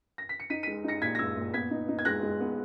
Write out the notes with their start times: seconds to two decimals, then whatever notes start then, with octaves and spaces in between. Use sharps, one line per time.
0.18 A#6
0.29 B6
0.40 C#7
0.50 D#4 B6 D#7
0.63 B6 D#7
0.67 G#3
0.84 D#4 A#6 C#7
1.02 A#2 G#6 B6
1.15 A#6
1.19 G#3 E6 G#6
1.36 A#2
1.54 B3 G#6 B6
1.71 D#4
1.89 D#4
1.99 G#6
2.05 G#3 F#6 A#6
2.23 G#3
2.40 B3